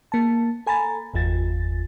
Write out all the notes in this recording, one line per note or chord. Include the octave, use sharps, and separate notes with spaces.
A#3 A5
A4 G#5 A#5 B5 A6
G1 E2 F4 A6